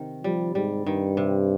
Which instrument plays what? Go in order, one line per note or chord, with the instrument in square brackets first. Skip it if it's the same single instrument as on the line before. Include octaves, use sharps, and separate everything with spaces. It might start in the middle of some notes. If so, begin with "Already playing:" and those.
Already playing: [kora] C3 D#3
[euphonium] F3 [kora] G3
[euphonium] G#2 [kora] G3
[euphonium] G2 [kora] D#3
[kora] C3